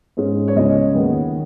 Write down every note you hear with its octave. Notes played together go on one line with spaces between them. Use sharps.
G#2 G#3 C#4
C#5
C#2 C#3 G#3 C#4 D#5
D#2 D#3 B3